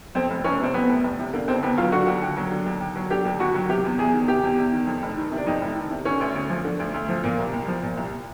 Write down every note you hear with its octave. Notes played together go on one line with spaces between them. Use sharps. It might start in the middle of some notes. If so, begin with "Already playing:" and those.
F2 C4
F1
F1 C#4
C3 C4
F2 B3
F1
F1
C3
D3 A#3
D#2 C4
D#2 B3
F#3 F4
D3 F#4
D#2
D#2
F#3
D3
D#2
D#2
F#3
D3 G4
D#2
D#2 F#4
F#3
C3 G4
E2
E2 G#4
D#3
C3 G4
E2
E2
D#3
F2
F1
D#3
C3 D4
F2 D#4
F1
D#3
C3
D3 C#4
D2
D2
F3
D3
D2
D2
F3
A#2 A#3
C2
C2
F3
A#2
C2